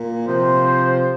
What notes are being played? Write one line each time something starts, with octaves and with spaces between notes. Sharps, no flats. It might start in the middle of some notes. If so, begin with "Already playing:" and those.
Already playing: A#2
C3 F3 C5